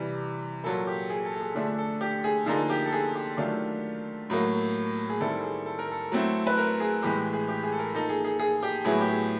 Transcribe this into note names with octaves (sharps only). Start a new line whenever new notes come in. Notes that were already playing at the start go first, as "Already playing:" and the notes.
Already playing: C3 E3 G3
A#2 F#3 A#3 A4
G4
G#4
A4
A4
G#4
D3 F3 A3 D4 G#4
A4
G4
G#4
D3 F3 A#3 D#4 G#4
G4
A4
G#4
G4
D#3 F#3 A3 D4 F4 G4
A2 F#3 A#3
G#4
D#3 G3 C4 E4 A4
G#4
A4
A#4
A4
F#3 A3 C4 E4
B4
A#4
G#4
A2 E3 G#3 G4
G#4
G4
G#4
A4
A#4
F3 A#3 D#4 A4
G#4
G#4
G#4
G4
A2 F#3 B3 E4 G#4
G4
G#4